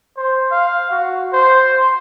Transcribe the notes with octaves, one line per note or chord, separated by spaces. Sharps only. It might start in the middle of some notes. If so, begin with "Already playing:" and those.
C5
F5
F#4
C5